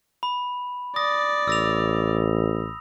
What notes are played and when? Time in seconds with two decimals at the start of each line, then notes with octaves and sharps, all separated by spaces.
0.23 B5
0.96 D5 D#6 A#6
1.48 A1 E6 A#6 F7